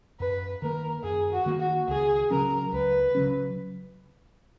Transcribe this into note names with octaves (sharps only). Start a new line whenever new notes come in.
F#2 B4
D#3 A#3 A#4
F#2 G#4
F#4
D#3 A#3
F#4
C#2 G#4
C#3 F#3 C#4 A#4
C#2 B4
C#3 F#3 C#4